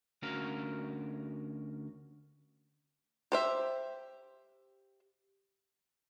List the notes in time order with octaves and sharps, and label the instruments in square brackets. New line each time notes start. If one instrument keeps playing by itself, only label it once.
[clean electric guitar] D2 C#4 F#4 A#4 F5
[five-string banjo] G4 C5 E5